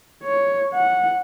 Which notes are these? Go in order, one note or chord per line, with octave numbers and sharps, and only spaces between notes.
C#5
F#5